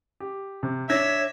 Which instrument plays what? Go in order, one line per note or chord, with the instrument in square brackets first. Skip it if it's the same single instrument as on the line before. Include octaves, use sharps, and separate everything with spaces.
[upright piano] G4
C3
[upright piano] D4 G#6 A#6 [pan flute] C#5 [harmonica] E5